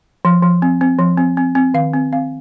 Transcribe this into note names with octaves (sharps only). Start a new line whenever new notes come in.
F3
F3
C4
C4
F3
C4
C4
C4
D#3 F5
C4
C4 F5